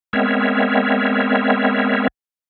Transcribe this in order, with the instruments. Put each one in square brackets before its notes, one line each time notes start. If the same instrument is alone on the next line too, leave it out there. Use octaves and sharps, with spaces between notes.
[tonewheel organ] G#3 B3 C4 A#4 C#5 E5